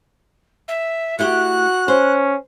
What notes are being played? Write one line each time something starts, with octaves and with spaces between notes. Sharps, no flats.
E5
A3 E4 F#4 G4 F#6
C#4 C5